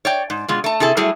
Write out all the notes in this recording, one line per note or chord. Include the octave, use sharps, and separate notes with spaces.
C#5 D5 G5
G#2
B2 G#3 F4
A3 A5
C3 E4 G#4 A4
F#3 G3 A3 E4 G#4